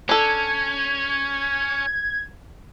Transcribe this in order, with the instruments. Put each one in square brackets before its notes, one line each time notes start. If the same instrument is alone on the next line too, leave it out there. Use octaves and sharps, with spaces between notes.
[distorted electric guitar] C#4 [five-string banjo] D4 A4 [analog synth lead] G#6